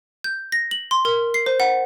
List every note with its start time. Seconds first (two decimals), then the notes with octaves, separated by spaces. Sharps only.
0.24 G6
0.52 A#6
0.71 F#7
0.91 C6
1.05 A#4
1.34 C7
1.46 C5
1.60 F#5